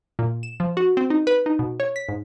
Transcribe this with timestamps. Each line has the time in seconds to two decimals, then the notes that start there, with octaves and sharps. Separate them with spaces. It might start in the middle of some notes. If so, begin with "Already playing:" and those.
0.19 A#2
0.43 E7
0.60 F3
0.77 F#4
0.97 C4
1.10 D#4
1.27 B4
1.46 D#4
1.59 B2
1.80 C#5
1.96 B6
2.09 G#2